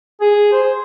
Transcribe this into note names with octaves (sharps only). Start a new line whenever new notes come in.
G#4
C5